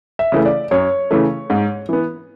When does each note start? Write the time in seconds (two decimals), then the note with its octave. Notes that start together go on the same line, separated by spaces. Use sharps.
0.19 E5
0.32 C#3 E3 A3
0.45 D5
0.71 F#2 C#5
1.11 C#3 E3 A3
1.50 G#2
1.89 E3 B3